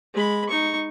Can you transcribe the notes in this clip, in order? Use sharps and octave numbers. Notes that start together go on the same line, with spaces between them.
G#3 B5
D#4 C#6